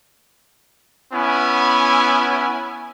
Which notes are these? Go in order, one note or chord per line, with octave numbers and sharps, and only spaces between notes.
B3 C#4 E4 G#5